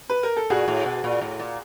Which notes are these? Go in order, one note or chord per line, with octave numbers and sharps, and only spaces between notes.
B4
A#4
A4
A#2 F#4 G#4
A2
B2
A#2
A2
A#2